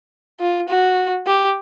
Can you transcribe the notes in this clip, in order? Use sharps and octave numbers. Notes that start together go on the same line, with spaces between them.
F4
F#4
G4